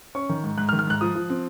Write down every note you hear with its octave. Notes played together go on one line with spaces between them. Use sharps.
C#4 C#6
D#3
G#2
G#2 F#6
F6
D#3
F6
G#2 F#6
F3 D#6
F3
C4